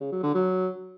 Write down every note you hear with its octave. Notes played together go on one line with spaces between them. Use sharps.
C#3
F#3
D3
F#3